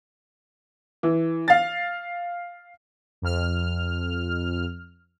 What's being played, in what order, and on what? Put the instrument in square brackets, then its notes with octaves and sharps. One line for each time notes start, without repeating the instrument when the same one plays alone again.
[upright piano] E3
F5 A6
[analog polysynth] F2 F6